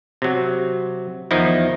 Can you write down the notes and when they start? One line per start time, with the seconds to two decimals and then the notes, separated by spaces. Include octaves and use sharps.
0.22 C3 F#3
1.31 E2 D#3 F3 D#4 E4